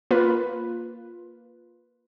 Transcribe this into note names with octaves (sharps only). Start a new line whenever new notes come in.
A#3 F4 B4